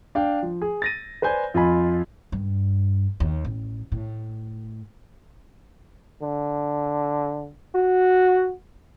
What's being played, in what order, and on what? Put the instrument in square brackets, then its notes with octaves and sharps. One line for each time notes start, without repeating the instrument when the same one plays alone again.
[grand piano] D4 F5 G5
F3
G#4
A6 A#6 D#7
B4 C5 D5 G#5 G6
F2 F4 D#5 G#5 B5
[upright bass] G2
D#2
A1
A2
[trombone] D3
F#4